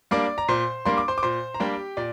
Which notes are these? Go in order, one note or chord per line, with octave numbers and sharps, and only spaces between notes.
G3 A#3 D4 D5 D6
A#5
A#2 C5 C6
G3 A#3 D4 C6
D6
C5 C6
D6
A#2 C5 C6
A#5
G3 A#3 D4 G4 G5
A#2 D5